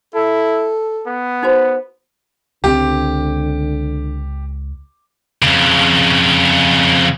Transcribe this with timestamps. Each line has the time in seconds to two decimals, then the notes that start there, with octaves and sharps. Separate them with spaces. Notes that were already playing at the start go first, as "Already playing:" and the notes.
0.14 E4 A4
1.06 B3
1.43 D#4 F#4 C5
2.64 C#2 D3 A3 C4 G4
5.42 F2 C#3